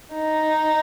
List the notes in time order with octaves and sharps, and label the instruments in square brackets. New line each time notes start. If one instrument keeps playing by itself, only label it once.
[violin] D#4